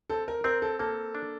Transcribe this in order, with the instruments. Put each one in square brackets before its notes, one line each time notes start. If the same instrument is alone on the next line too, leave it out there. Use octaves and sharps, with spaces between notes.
[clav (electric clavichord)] C4 [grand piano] A4
[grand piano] A#4
[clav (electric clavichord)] C4 [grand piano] A#4
[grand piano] A4
[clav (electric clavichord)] A#3 [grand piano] A4
[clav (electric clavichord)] D4